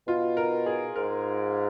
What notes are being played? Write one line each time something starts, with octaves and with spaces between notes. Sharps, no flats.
B2 F4
A#4
G#4
G#2 A#4